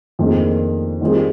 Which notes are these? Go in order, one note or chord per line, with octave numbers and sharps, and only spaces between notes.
F2 D#3 A#3 D4 G#4
D#3 G3 C4 F4 G#4